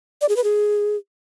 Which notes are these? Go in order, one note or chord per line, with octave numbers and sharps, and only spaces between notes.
D5
G#4
B4
G#4